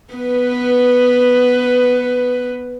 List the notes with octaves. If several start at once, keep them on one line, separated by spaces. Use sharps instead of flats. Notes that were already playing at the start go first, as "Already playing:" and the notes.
B3 B4